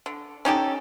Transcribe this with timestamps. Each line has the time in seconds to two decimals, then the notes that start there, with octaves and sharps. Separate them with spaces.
0.06 D3
0.45 C#4 D#4 G4 A4